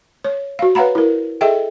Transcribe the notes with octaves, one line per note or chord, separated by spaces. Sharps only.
C#5
F#4 F5
B4 C#5 F5 F#5 A#5 B5
E4 A#4
G#4 A4 D#5 E5 G5